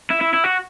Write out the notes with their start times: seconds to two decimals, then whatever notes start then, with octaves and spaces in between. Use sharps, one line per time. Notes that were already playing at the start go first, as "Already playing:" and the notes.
0.10 E4
0.21 E4
0.33 E4
0.44 F#4